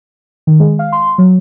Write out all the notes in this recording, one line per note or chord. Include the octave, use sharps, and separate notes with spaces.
D#3
G#3
F5
C6
F#3